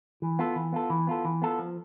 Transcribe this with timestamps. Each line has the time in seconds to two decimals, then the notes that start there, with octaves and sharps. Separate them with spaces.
0.22 E3
0.39 B3 F4 A4
0.56 E3
0.72 B3 F4 A4
0.90 E3
1.07 B3 F4 A4
1.25 E3
1.42 B3 F4 A4
1.59 F3